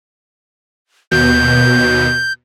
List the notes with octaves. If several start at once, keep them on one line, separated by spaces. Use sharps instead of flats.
D#2 B2 G6